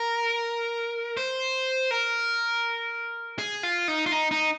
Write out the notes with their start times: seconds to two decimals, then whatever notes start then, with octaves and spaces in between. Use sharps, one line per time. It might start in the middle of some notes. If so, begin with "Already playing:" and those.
Already playing: A#4
1.17 C5
1.91 A#4
3.38 G#4
3.63 F4
3.88 D#4
4.06 F4
4.12 D#4
4.31 D#4